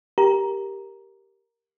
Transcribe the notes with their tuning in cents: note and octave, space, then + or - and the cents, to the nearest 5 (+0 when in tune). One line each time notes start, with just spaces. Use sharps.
G4 +0 A#4 +0 A#5 +5